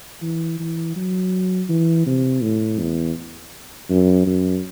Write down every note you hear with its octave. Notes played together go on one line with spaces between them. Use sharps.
E3
E3
F#3
E3
C3
A2
E2
F#2
F#2